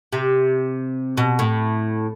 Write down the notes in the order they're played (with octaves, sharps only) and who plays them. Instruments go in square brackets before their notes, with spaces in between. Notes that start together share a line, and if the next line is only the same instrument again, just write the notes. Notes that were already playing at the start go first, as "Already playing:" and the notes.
[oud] C3
B2
A2